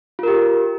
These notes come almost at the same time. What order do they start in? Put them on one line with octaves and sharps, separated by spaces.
F4 A#4 G4